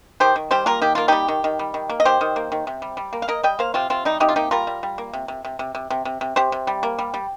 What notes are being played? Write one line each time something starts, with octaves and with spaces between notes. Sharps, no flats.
D#3 G4 C5
D#3
G3 G4 C5
A#3 F4 A#4
D#3 G4
A#3 F4
G3 D#4 G4
D#3
D#3
G3
D#3
A#3
D#5
D#3 G4 C5
D#3
A#3
D#3
C3
G3
G3
A#3
F5
A#3 A#4 D#5
G3 D#5 G5
A#3 C5 F5
C3 C4 F4
C3 C4 F4
G3 D#4
C3 D#4 G4
F4
A#3 D#4 G4
G3 F4 A#4
G3
G3
A#3
C3
C3
C3
C3
C3
C3
C3
C3
C3 G4 C5
C3
G3
A#3
G3
G3